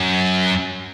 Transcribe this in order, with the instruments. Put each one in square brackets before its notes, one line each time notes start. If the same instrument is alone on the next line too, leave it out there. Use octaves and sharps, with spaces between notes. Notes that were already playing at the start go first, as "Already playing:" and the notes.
Already playing: [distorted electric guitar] F#2